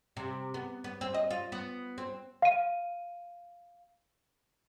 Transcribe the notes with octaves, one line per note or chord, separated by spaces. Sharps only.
C3
B3
B3
C4
D#5
F4
B3
C4
F5 D#7